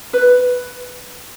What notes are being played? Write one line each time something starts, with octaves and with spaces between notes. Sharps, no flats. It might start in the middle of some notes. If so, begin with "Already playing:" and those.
B4